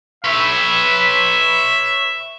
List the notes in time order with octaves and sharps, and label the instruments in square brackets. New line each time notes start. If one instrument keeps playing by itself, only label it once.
[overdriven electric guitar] B4 C#5 [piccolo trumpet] E5